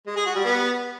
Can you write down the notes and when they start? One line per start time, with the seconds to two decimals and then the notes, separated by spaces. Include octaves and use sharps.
0.07 G#3
0.16 G#4
0.26 F#4
0.35 G3
0.44 B3